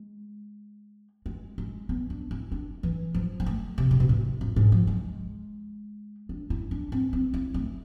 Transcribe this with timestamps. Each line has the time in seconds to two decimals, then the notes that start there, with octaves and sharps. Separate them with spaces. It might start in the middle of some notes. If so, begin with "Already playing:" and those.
Already playing: G#3
1.26 G#3
1.58 G#3
1.89 B3
2.10 D4
2.31 E4
2.52 D4
2.83 E3
3.15 F3
3.40 G#3
3.46 A3
3.78 C3
3.91 C3
4.00 B2
4.09 A2
4.41 F2
4.56 G#2
4.72 F3
4.87 G#3
6.29 D4
6.50 E4
6.71 D4
6.92 C4
7.13 C4
7.34 E4
7.54 A3